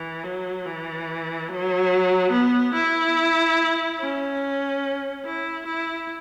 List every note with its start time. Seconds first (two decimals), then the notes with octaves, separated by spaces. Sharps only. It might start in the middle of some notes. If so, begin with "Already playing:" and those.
Already playing: E3
0.24 F#3
0.66 E3
1.49 F#3
2.32 B3
2.74 E4
4.00 C#4
5.25 E4
5.66 E4